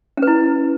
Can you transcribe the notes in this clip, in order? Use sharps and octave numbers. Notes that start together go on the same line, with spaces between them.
C#4 E4 B4